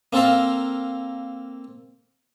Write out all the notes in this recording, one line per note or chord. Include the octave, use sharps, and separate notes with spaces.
A#3 C4 A4 A#4 F5